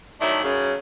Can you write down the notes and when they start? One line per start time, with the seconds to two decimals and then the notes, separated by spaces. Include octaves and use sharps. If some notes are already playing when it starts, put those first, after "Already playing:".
0.21 D#3 F#3 A3 D4 E4
0.43 F#2 C#3